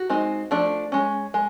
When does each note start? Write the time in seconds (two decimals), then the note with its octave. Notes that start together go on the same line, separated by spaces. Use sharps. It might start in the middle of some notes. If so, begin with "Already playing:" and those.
Already playing: F#4
0.10 G#3 C4 D#4
0.51 F3 A3 D4
0.92 G#3 C#4
1.34 G#3